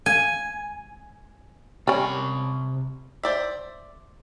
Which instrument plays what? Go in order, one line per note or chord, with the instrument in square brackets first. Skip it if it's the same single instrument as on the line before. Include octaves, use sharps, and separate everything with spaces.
[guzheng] G#5
[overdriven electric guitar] C3 B5 [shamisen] G3 C#4
[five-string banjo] C5 D5 E5